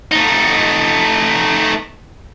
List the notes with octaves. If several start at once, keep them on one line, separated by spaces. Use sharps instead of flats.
A3 D#4